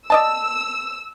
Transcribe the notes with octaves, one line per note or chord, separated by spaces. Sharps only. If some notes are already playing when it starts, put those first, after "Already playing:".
D5 D#5 A5 E6